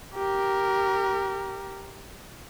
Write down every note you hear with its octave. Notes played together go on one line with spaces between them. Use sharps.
G4 A#4